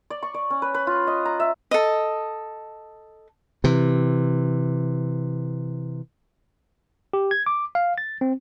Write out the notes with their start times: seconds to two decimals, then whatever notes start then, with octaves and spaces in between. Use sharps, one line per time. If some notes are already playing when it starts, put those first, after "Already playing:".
0.10 D5
0.23 C#6
0.34 D5
0.50 C#4
0.62 B4
0.74 B4
0.87 F4
1.07 D#5
1.25 A#5
1.40 E5
1.71 A4 D#5
3.64 C3 E3
7.13 G4
7.31 G#6
7.46 D6
7.75 F5
7.98 A6
8.21 C4